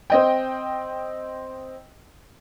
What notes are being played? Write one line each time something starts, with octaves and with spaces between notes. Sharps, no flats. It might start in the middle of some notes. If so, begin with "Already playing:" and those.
C4 D#5 G5